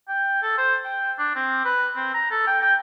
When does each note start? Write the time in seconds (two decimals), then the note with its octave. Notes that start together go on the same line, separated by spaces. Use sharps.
0.08 G5
0.42 A4
0.58 C5
0.84 G5
1.19 D4
1.35 C4
1.65 B4
1.96 C4
2.14 A#5
2.31 A4
2.47 G5
2.62 G5